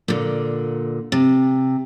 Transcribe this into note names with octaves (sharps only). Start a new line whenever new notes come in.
A#2 D3
C3